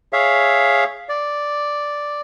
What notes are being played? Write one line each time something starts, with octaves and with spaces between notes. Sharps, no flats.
G#4 C#5 E5 F5
D5